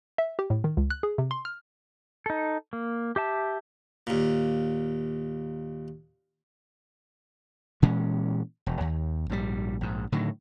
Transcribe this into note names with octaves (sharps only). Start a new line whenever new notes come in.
E5
G4
A2
D#3
C#2
F#6
G#4
C3
C6
F6
D#4 A4
A#3
G4 E5 A5
D#2 A#2
A#2 E3 G#3 C#4
E1
D#2
A#1 G#2 C3 G3
A#1 G#2
A2 D3 D#3 F#3